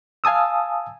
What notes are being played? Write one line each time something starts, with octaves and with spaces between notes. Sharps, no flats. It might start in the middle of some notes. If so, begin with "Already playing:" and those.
F5 G#5 A5 D#6 E6